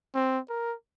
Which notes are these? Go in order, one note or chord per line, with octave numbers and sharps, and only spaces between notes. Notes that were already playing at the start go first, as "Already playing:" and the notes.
C4
A#4